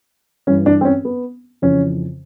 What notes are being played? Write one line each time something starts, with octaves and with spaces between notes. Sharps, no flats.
G2 E3 C#4
D4
C4
C#4
B3
F2 C#3 E3 C#4